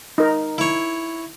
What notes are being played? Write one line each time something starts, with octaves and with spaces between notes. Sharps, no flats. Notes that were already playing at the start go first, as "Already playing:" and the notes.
D#4 A#4
E4 C#5